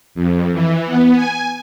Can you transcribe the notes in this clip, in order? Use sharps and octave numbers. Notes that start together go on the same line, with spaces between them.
F2
E3
B3
G#5